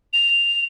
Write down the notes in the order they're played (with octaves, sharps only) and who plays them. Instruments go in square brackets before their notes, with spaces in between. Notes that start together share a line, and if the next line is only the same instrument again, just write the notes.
[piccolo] F7